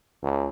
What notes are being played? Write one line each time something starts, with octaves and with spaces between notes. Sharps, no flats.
C#2